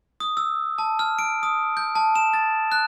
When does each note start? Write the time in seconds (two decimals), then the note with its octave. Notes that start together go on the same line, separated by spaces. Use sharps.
0.20 D#6
0.37 E6
0.78 A5
0.99 F6
1.19 D7
1.43 D#6
1.77 G6
1.95 A5
2.16 E7
2.34 A6
2.72 F#6